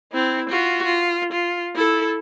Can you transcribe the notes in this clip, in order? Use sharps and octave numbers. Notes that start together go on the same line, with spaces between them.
C4 E4
F4 F#4
F4
F4
E4 A4